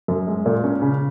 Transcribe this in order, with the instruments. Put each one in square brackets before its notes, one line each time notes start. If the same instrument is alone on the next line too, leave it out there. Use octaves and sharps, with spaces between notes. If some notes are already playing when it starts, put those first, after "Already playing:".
[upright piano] F#2
G#3
A#2
C#4
C#3